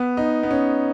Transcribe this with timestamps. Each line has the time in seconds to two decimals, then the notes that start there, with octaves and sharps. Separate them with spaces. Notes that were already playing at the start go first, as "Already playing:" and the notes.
Already playing: B3
0.17 D#4
0.43 B3
0.51 C#4